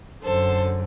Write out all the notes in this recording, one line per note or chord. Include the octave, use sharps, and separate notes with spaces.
F#2 D3 A4 C5